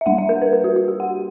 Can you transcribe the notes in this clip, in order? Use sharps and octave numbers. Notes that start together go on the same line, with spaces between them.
E5
G3 A#3 D4 F#5
E5
A#4
B4
A#4
F#4
F#4
G4
F#5